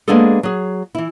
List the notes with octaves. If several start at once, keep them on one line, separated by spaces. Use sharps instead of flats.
G#3 A#3 B3 D4 G#4 A4
F#3 G#4
E3 E4